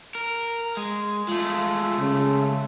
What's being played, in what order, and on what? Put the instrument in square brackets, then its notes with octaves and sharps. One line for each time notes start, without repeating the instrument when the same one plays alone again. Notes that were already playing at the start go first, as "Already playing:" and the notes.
[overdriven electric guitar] A#4
G#3
[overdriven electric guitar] G#3 A3 [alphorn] F4
[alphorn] C#3